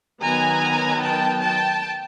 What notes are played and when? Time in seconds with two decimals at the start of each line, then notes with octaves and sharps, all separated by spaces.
0.22 D#3 F#3 B3 G#5 A#5
1.02 G5 A5
1.42 G5 A5